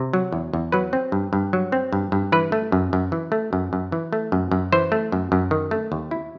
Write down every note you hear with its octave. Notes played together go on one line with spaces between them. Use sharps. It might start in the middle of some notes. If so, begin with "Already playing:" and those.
Already playing: C3
F#3
E2
E2
F#3 B4
C4
G2
G2
F#3
C4
G2
G2
E3 B4
A3
F#2
F#2
E3
A3
F#2
F#2
E3
A3
F#2
F#2
E3 C5
A3
F#2
F#2
D#3
A3
D#2
E4